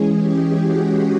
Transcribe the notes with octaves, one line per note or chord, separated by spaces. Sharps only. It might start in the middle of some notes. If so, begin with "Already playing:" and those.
Already playing: E3 G#3 C#4 G#4
G4
F#4